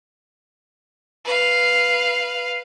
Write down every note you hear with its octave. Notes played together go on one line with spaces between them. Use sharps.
B4 F5